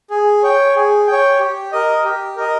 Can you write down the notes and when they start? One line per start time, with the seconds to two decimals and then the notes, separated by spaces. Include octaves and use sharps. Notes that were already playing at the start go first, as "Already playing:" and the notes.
0.10 G#4
0.43 C#5 G5
0.75 G#4
1.07 G5
1.12 C#5
1.39 G4
1.72 A#4 D#5
2.04 G4
2.36 A#4 D#5